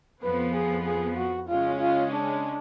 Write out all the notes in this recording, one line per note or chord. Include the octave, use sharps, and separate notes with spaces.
F2 F3 B3 B4
G#4
G#4
F#4
C#3 G#3 C#4 F4
F4
D4